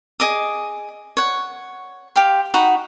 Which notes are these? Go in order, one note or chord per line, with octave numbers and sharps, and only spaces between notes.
G#4 D#5 D6 D#6
C#5 F#5
G4 F5 G5 C6
D#4 F#4 F#5 B5